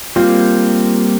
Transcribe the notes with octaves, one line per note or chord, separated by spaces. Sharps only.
G3 A#3 C4 F4